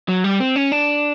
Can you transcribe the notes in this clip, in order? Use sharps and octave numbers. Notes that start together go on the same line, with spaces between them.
F#3
G3
C4
C#4
D4